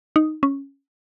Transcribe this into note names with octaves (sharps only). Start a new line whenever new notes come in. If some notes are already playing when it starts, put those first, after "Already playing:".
D#4
C#4